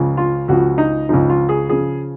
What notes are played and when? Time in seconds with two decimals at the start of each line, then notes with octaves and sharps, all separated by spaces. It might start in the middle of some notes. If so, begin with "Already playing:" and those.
Already playing: C#2 C#3 F3
0.17 F4
0.48 C#2 C#3 F3 F#4
0.78 D#4
1.09 C#2 C#3 F3 D#4
1.30 F4
1.49 G#4
1.69 C#3 F3 G#4